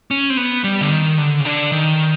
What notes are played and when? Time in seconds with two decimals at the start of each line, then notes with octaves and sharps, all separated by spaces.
0.11 C#4
0.30 C4
0.37 B3
0.64 G3
0.81 D3
0.91 D#3
1.18 D3
1.40 C#3
1.45 D3
1.72 D#3